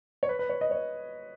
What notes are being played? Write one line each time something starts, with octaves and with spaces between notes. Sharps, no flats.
C#5
B4
B4
C#5
D#5
C#5